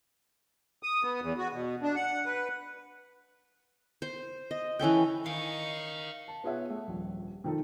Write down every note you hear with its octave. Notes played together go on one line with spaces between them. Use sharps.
D#6
B3
E2
F#4
B2
D4
F#5
B4
C5
D#5
E3 C#4 A4 G5
D#3 D#4 C#5 F5 C#6
A5
B3 F4 G#4 C#5 E5 F#5
A3
D#1 A#1
D#3 F3 D#4 A4